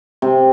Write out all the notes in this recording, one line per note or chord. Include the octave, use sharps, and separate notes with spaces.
C3